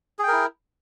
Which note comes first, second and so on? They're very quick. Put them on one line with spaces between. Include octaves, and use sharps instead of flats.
G#4 G5 A#4 E4